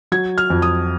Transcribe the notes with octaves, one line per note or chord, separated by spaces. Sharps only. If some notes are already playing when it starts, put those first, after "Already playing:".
F#3 G#6
F6
F2
D#6